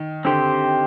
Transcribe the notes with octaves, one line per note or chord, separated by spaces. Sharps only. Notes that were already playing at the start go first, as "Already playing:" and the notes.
Already playing: D#3
D3 C4 G4 C5